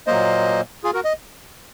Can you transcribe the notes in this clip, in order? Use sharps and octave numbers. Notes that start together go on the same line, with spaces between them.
A#2 F#3 A#3 C5 D#5
F4 G#4
F#4 A#4
D#5